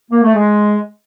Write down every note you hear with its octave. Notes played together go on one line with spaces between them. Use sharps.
A#3
A3
G#3